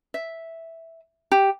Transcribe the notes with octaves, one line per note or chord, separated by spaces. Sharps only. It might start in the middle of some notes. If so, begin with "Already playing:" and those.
E5
G4